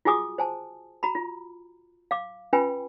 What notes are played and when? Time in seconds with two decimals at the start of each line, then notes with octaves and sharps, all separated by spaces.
0.05 F4 F#4 G#4 G#5 D6 D#6
0.38 C5 G#5 A5
1.03 F#4 A#5 B5
1.15 F4
2.11 F5 D6
2.53 C#4 F4 B4 G5 G#5 B5